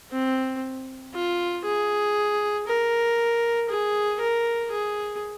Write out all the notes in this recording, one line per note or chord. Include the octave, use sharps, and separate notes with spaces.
C4
F4
G#4
A#4
G#4
A#4
G#4